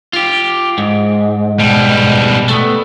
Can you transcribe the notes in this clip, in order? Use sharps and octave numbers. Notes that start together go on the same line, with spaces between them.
F4 G4
G#2
B2 G3
A3 B3